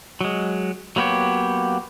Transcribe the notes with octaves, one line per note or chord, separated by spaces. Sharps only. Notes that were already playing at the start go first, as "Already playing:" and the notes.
F#3 G#3
F#3 A#3 B3 G4 C#5